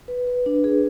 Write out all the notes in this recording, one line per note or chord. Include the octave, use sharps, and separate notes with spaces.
B4
B4
D4
G#4